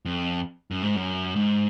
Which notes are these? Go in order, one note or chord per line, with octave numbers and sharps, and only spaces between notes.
F2
F#2
G#2
F#2
G#2